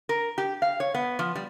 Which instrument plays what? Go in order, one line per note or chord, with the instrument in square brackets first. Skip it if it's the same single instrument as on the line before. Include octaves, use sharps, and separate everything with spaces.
[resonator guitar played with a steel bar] A#4
G4
F5
C#5
B3
F3
G3